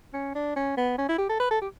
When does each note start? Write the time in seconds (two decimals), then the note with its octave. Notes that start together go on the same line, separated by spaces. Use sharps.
0.13 C#4
0.35 D4
0.56 C#4
0.77 B3
0.98 C#4
1.09 E4
1.18 G4
1.29 A4
1.40 B4
1.51 A4
1.61 G4